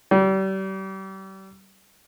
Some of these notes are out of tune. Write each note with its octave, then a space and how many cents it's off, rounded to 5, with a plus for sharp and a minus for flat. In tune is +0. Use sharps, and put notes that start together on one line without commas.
G3 -35